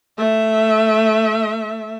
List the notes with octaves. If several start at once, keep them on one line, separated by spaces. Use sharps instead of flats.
A3 E5